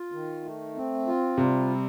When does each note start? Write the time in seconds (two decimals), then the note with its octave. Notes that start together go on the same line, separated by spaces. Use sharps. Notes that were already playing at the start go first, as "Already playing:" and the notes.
Already playing: F4
0.12 D#3
0.44 A3
0.76 C4
1.07 F4
1.38 C3 G3
1.69 C4